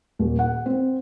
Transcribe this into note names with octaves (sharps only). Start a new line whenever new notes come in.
D#1
F#5
C4